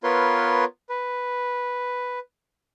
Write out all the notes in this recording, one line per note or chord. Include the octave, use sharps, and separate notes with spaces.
B3 F4 A#4 B4 C#5 C6
B4